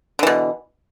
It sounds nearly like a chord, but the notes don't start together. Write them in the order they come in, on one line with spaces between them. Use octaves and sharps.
D3 E3 B2